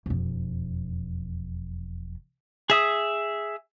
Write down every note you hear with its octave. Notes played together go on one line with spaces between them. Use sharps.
E1 F2
G#4 E5 D#6